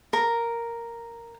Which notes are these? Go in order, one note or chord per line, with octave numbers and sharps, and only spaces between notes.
A#4